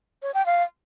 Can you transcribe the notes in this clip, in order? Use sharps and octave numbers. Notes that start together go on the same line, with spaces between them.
C#5
G5
F5